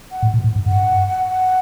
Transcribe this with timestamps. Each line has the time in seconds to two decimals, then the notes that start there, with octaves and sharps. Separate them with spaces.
0.11 F#5
0.23 A2
0.34 A#2
0.44 A2
0.56 G#2
0.66 G2 F#5